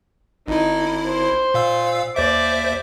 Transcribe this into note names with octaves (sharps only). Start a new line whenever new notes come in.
G#1 D#4 E4
C5
A#2 F5 E6
D#2 C5 D5 E5